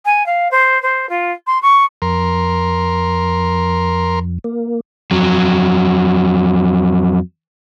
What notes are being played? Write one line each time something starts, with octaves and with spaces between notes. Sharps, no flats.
G#5
F5
C5
C5
F4
C6
C#6
F2 A#4 C6
A#3
F2 F#3